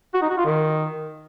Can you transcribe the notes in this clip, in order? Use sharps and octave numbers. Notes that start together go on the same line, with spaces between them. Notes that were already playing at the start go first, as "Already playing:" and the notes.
F#4
D#4
F#4
F4
D#3